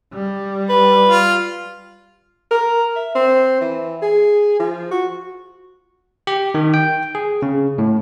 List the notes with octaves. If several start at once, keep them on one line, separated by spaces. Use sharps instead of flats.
G3
B4
F4
A#4
E5
C4
E3
G#4
F3
F#4
G4
D#3
G5
G#4
C#3
A2